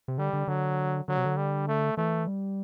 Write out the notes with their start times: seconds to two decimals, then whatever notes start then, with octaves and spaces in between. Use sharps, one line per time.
0.08 C3
0.18 D3 G3
0.33 D3
0.48 D3 F#3
1.08 D3 F#3
1.17 C3
1.25 D3
1.37 G3
1.68 A3
1.97 E3 A3
2.27 G3